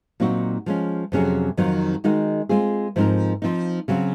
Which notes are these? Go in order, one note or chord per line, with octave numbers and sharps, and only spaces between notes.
A#2 F#3 C4 D#4 F#4
F3 G#3 C#4
F2 C3 F#3 C#4 G#4
F2 D#3 F#3 C4 D#4
D#3 G#3 D#4 F#4 A#4
G#3 C4 F4 G#4
G#2 F3 C4 D#4 A#4
F3 C4 D#4
C#3 F#3 C4 F#4